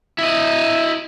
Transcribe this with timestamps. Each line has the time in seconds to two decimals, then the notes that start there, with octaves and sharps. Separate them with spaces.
0.18 E4 D#5